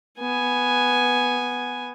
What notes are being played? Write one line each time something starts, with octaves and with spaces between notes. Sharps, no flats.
B3 G#5